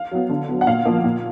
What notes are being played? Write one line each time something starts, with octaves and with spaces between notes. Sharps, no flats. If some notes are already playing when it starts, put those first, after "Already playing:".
Already playing: F5
F#3 B3
D3
F#3 B3
F#5
A#2 F5
F3 A#3
A#2